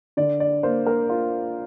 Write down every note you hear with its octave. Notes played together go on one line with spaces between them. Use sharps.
D3 D5
D5
A#3 C5
A#4
F4